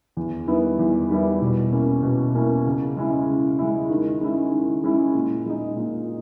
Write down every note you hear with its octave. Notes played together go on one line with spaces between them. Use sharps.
E2
D#3 G3 B3 E4
E2
D#3 G3 B3 E4
B2
A#3 C#4 E4
B2
A#3 C#4 E4
C#3
G#3 C#4 E4
C#3
G#3 C#4 E4
D#3
G#3 C#4 E4
D#3
G#3 C#4 E4
A#2
G#3 D#4
A#2